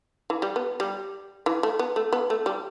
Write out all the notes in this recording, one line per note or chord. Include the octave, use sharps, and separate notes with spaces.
E3
G3
B3
G3
E3
A3
B3
A3
B3
A3
G3